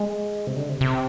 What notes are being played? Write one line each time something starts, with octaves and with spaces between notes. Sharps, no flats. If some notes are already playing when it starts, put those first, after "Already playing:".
Already playing: G#3
C3
D3
C3
C3